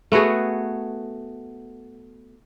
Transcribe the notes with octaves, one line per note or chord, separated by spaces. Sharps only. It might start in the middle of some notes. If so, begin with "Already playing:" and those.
A3 B3 F#4 G#4